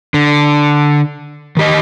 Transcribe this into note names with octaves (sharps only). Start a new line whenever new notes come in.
D3
D#3 G4 D#5